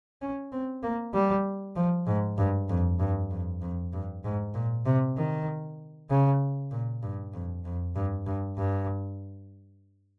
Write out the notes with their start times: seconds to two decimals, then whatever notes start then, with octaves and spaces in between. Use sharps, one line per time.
0.21 C#4
0.52 C4
0.83 A#3
1.14 G3
1.76 F3
2.06 G#2
2.37 G2
2.69 F2
2.99 G2
3.31 F2
3.61 F2
3.93 G2
4.24 G#2
4.54 A#2
4.85 C3
5.17 D#3
6.10 C#3
6.71 A#2
7.02 G2
7.33 F2
7.65 F2
7.95 G2
8.26 G2
8.57 G2